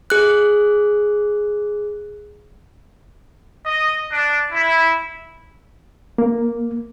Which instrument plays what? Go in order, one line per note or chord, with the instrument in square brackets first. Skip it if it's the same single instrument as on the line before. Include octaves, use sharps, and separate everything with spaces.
[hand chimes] G#4 F#6
[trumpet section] D#5
D4
E4
[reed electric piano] A#3